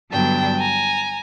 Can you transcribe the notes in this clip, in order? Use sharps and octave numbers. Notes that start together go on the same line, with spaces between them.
G2 D3 F#3 B3 G5 A5
G#5 A#5